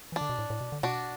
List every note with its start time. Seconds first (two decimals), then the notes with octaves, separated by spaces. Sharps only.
0.12 E3 D4
0.21 D3
0.29 B2
0.39 A2
0.50 A2
0.61 B2
0.72 D3
0.83 B2 D4 F#4